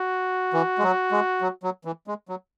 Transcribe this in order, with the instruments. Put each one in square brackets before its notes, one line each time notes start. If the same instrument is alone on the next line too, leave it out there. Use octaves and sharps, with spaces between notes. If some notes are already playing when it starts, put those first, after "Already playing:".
Already playing: [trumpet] F#4
[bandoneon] E3
G#3
F#3
G#3
F#3
F#3
E3
G#3
F#3